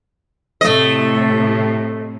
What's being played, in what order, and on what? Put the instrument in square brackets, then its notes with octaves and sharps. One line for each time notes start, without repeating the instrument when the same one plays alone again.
[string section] A2 C3 [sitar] A3 D#5